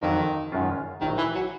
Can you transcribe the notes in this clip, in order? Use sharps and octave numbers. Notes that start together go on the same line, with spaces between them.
F2 D3 D#3 F#3
F#2 D#3 G#3 C#4 F4
A#1 A2 D#3 F#3
E3
F#3